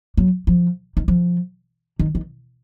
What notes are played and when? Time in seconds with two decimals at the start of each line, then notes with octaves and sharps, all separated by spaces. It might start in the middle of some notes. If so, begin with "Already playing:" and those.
0.17 F#3
0.47 F3
0.97 D#3
1.08 F3
1.99 D#3
2.15 D#3